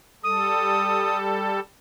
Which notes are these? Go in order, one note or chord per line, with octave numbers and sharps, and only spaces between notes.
G3 A4 D#6